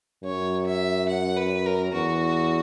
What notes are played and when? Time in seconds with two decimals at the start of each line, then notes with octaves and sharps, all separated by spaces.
0.24 F#2 C#5
0.67 E5
1.08 F#5
1.37 B4
1.66 A#4
1.93 E2 F#4